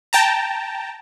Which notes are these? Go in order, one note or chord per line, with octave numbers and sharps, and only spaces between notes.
G5 A5 A#5